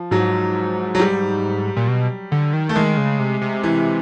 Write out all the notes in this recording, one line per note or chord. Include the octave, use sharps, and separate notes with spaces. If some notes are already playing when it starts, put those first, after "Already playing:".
Already playing: F3
G#2 F#3
F#3
G3
A#2
B2
D3
D#3
A3
D#3 G#3
C#3
C3
C3
E3